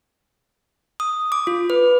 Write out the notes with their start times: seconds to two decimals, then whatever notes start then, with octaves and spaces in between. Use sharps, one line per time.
1.00 D#6
1.32 D6
1.47 F4
1.70 B4